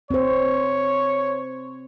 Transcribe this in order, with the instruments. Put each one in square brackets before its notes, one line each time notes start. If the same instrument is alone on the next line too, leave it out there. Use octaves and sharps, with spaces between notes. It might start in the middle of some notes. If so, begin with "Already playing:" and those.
[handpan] C4 C5 [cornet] C#5